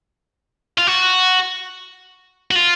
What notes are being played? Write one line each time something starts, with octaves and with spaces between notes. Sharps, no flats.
F4
F#4
F#4
F4